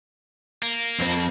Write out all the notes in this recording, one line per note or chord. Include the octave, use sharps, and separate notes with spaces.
A#3
F2 C4